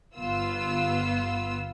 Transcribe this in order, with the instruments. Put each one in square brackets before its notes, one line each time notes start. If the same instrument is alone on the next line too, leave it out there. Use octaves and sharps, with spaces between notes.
[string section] G1 B3 F4 E6